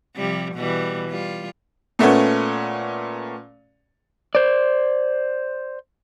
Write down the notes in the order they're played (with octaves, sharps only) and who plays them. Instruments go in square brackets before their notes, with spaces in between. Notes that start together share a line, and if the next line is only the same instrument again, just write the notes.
[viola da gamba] C3 F3 G3
B2 E3 G3
G3 F4
[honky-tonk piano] A#2 A3 B3 C#4
[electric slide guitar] C5 D5